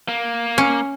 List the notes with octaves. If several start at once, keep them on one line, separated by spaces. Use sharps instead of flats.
A#3
C#4